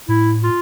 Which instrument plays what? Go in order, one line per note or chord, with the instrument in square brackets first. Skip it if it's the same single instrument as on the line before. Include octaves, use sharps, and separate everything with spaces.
[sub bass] A2 [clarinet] E4
[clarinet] F4